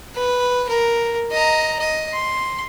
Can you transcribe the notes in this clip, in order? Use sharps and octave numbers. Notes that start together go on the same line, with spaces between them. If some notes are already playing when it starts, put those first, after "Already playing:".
B4
A#4
D#5 A#5
D#5
C6